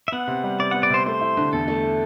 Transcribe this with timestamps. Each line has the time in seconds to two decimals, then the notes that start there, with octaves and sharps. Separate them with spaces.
0.08 E5
0.12 B3 F#5
0.28 C3
0.44 G3
0.59 C3 D5
0.71 B3 F#5
0.83 D5
0.90 C3 C5
1.06 A3 C5
1.21 E4
1.37 D3
1.53 E2 A4
1.68 A3
1.83 E4